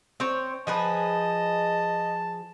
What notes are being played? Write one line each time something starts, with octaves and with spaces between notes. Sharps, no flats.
C4 C5 C#5
F3 G#4 B4 D#5 A5